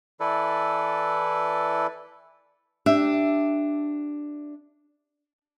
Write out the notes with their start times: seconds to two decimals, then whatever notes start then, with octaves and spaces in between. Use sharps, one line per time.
0.20 E3 E4 A4 B4 D5
2.86 D4 G4 E5